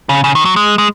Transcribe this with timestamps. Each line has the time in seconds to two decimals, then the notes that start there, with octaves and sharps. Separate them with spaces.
0.09 C#3
0.24 C#3
0.35 D#3
0.45 F#3
0.56 G#3
0.78 G#3